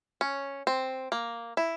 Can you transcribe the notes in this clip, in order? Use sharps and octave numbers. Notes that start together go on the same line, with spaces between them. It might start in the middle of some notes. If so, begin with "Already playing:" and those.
C#4
C4
A#3
E4